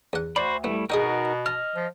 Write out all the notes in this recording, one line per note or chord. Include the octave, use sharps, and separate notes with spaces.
E2 F#5
D2 F#4 C5 D5 B5
G3 A3 B3 E4
B2 D#4 F#4 G#4 A#4 D#5 G5
D#5 A5 F6
F3